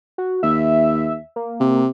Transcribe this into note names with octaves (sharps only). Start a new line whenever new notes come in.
F#4
D#2 E5
A#3
C3